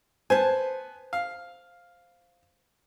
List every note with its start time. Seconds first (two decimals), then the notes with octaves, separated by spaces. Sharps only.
0.30 B3 C5 G#5 A5
1.13 F5